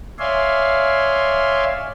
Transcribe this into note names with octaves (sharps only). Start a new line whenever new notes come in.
C#5 D5 E5 F5 G#5 C6